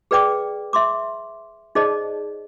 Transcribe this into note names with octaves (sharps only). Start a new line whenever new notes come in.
G#4 B4 D5 G5 D6
E5 C6 D6
D#4 G#4 C5 D5 D#5 A5